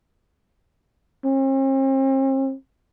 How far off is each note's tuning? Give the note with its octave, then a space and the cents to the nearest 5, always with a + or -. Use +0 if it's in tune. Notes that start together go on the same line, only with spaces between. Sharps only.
C4 +45